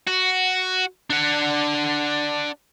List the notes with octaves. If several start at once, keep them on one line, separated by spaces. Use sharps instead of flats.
F#4
D4 F#5